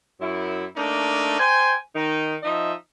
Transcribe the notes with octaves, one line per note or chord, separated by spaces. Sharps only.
F#2 E4
A3 A#3 D4 D#4
C5 G5 G#5
D#3 D#4
F3 D#4 D#5 E5